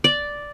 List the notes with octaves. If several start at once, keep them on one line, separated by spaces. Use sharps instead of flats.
D5